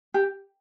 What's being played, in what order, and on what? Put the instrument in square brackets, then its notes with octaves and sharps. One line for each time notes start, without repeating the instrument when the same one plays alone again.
[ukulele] G4